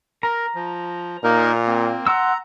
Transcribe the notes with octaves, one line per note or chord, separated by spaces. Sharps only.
A#4 A#5
F3
A#2 A#3 D#4 A#4
A#3 C4
F#5 A#5 C6 E6